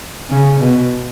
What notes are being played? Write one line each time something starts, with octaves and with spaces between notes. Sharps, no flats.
C#3
B2